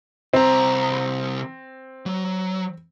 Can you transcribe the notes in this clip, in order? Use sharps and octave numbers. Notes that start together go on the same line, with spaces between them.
C2 C4 A#5
F#3